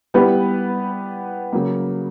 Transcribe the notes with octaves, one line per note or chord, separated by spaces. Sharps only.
G3 B3 E4 G4 B4
C#3 F#3 A#3